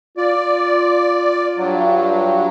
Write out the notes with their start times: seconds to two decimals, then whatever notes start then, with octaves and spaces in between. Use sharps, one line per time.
0.17 F4 D5
1.58 G2 F#3